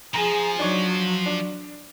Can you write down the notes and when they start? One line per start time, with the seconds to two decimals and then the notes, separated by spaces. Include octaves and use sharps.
0.14 F3 G#4 G#5 A#5 A#6
0.59 F#3 D4 D#4 C#5
1.26 D4